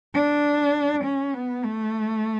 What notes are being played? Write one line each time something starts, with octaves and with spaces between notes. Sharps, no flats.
D4
C#4
B3
A3